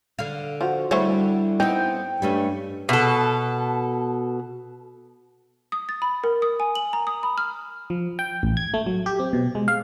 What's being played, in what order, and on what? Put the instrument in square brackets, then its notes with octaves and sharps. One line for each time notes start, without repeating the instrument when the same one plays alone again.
[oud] D3 F5
[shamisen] F3 [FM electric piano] F#4 C5
[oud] D3 G3 [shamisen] A3 C5 C#5 [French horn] E4 [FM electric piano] F#4
[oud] B3 C4 [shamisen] D#4 [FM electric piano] G5
[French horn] G2 [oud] G3 A3 C#4
[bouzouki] B2 A4
[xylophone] D#6
A6
B5
A#4
D#6
G#5
F#7
A#5
D#6
B5
F6
[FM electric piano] F3
G5
A1
G#6
A3
F#3
G4
C4
B2
G#3
F5